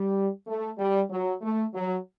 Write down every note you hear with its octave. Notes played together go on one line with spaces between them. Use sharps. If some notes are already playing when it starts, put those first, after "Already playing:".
Already playing: G3
A3
G3
F#3
A3
F#3